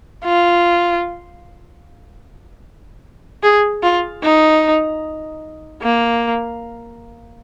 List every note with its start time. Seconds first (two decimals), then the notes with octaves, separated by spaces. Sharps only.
0.25 F4
3.43 G#4
3.83 F4
4.23 D#4
5.82 A#3